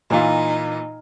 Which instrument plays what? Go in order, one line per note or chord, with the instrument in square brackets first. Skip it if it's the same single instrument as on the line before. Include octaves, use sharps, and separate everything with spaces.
[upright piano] A#2 E3 F4 [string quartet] D#4